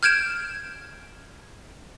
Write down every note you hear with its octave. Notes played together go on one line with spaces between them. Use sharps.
F6 G6 G#6 D7 E7